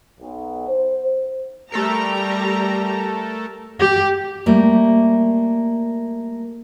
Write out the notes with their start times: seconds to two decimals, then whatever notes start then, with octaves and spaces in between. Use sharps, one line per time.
0.19 B1
0.67 C5
1.72 G3 A3 G4 A4 A#4 A#5
3.80 G4
4.46 G3 A3 A#3